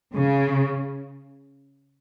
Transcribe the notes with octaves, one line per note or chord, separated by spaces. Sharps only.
C#3